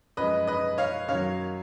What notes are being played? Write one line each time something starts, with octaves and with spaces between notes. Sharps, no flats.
F#2 F3 G#3 B4 D#5
B4 D#5
C#5 F5
F#2 D#3 F#3 C#5 F5